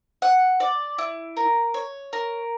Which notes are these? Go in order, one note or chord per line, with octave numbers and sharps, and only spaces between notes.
F#5
D5
E4
A#4
C#5
A#4